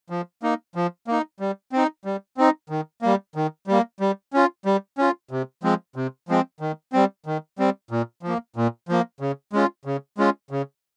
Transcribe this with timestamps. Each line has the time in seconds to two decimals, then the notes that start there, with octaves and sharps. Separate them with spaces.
0.10 F3
0.43 A#3 D#4
0.75 F3
1.07 A#3 D#4
1.40 G3
1.72 C4 D#4
2.05 G3
2.37 C4 D#4
2.70 D#3
3.02 G3 A#3
3.36 D#3
3.67 G3 A#3
4.00 G3
4.33 C#4 F4
4.65 G3
4.98 C#4 F4
5.31 C3
5.63 F3 G#3 C4
5.96 C3
6.29 F3 G#3 C4
6.60 D#3
6.93 G3 C4
7.26 D#3
7.59 G3 C4
7.91 A#2
8.23 F3 A#3
8.56 A#2
8.89 F3 A#3
9.20 C#3
9.53 G#3 C#4 F4
9.85 C#3
10.18 G#3 C#4 F4
10.51 C#3